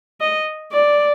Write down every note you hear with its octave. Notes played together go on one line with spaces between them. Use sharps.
D#5
D5